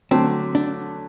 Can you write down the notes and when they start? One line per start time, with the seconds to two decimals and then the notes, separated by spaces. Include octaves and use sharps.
0.11 D3 F#3 A3 C4
0.55 D4